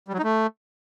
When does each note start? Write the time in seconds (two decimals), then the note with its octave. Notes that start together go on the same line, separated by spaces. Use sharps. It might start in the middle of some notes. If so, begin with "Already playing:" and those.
0.08 G3
0.13 F#3
0.19 D#4
0.24 A3